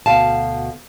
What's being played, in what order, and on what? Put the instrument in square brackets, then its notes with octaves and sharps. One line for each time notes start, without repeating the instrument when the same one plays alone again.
[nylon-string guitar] D2 B2 F5 A5